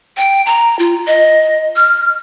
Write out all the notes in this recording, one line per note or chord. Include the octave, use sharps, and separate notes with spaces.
G5
A#5
F4
D#5
F6